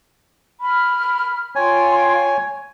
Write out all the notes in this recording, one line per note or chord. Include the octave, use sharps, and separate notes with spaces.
B5 F6
F4 C#5 G5 G#5 C6